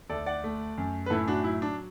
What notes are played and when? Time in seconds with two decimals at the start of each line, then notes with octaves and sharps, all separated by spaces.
0.09 D2 A4 D5
0.26 D5 F#5
0.44 A3
0.78 F#2
1.06 B4
1.10 A2 E4 A4
1.28 D4 F#4
1.44 F#3 E4
1.62 D4